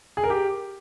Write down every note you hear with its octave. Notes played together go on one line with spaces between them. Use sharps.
G#4
A#4
G4